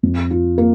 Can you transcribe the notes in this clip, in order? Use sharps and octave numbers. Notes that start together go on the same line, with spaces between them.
F2
F4
A#3